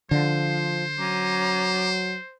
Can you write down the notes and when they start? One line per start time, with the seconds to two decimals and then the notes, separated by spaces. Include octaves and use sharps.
0.11 D3 F3 C5 F5
0.98 F#3 C#4 A#5 D6